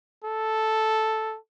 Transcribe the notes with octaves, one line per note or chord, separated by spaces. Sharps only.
A4